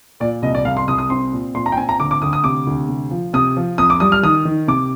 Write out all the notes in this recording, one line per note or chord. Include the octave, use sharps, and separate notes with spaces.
A#2 D5
C2 D#5
D5
C2 F5
C6
C2 D#6
D#6
C4 C6
A#2
A#2 C6
A#5
G5
C4 G#5
A#5
D2 D6
D6
D2 D#6
D#6
C3 D6
D2
C3
F3
C3 D#6
F3
F2 D#6
D6
G3 D#6
F6
D#3 D#6
D#3
C3 D6